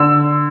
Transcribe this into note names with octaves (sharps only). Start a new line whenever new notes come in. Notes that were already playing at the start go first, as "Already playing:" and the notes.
Already playing: D3 E6